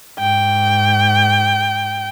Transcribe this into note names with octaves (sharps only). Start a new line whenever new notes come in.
G#2 G5